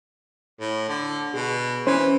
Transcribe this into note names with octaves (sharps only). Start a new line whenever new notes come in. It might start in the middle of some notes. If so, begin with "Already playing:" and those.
A2
D3
B2 G#4
E3 C#4 C5 G#6